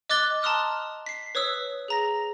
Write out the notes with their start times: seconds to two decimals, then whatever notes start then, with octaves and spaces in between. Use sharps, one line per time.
0.10 D#5 D6 F#6 A6 G7
0.42 A5 A#5 C6 D#6 F6 F#6
1.06 B6 C7
1.35 B4 C#5 D#6 E6 B6
1.88 G#4 A#5 A#6